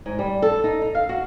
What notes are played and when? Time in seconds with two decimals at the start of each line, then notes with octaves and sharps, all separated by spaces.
0.06 G#2
0.19 G3
0.42 A4
0.64 D#4
0.82 D#4
0.95 F5
1.09 F#4